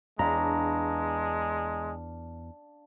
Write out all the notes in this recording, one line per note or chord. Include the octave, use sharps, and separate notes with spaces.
E2 G#3 D4 F5 A#5 B5